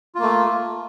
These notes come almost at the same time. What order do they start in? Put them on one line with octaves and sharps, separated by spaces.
F4 A#3 A3